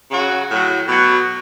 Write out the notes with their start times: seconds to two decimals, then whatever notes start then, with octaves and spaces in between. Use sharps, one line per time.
0.12 C#3 F#3 F#4
0.50 A2 F#3
0.88 B2 F#3